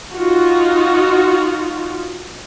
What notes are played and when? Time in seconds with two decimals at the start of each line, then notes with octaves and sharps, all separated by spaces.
0.12 D#4 F4 F#4